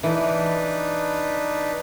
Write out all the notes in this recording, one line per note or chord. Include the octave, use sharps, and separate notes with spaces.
E3 D4 D#4 B4